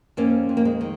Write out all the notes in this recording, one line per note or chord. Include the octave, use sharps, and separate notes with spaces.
F2 A#3 C#4
F2
A#3
G#3
D#3